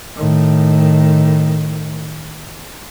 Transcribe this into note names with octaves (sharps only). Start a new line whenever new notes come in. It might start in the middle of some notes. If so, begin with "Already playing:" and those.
A2 D#3